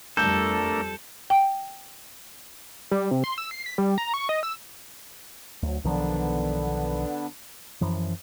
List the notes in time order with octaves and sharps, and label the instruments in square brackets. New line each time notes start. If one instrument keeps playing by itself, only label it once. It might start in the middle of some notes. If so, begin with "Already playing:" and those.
[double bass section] F2 G3 [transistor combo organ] A3 D4 A#4 [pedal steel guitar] A4 [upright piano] G6
[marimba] G5
[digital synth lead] G3
C3
C6
E6
C7
B6
G3
A#5
C#6
D#5
E6
[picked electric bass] D2 [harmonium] F#3
[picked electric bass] B1 D#3 F3 [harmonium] D3 B3 D4
[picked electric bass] F#2 E3 F3